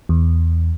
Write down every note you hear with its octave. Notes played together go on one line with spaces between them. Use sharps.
E2